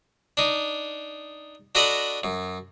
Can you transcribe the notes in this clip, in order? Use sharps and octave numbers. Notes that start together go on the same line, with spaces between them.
D4 D#4
D4 F#4 A4 D#5 A#5 B5
F#2